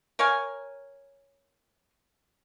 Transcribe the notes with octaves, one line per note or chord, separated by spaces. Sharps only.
A#4 C#5 F5 G#5